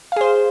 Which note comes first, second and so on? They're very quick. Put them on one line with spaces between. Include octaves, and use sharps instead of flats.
F5 G#4 C5